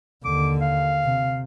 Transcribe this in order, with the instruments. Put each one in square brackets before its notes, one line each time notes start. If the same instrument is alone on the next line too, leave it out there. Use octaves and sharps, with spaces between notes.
[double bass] D#2 D3 [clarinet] D6
[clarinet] F5
[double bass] C3